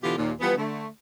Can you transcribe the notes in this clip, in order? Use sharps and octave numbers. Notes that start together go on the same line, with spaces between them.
B2 D3 E3 B3 F4 G4
D#2 A#2
E3 F3 G3 B3
D3 A3